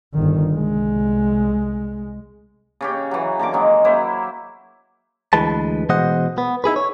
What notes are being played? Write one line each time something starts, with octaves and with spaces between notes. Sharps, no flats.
G1 D#3
C2 G#3
C#3 C#4 G4
E3 F#3
D3 A#3 A#5 D6
D#3 G#3 C#4
F#3 A#3 E4 C5
D2 E3 G#3 B4 A5
B2 E3 G#3 C5 D#5 F#5
B3
D#4 E4 G#4 B4
C#5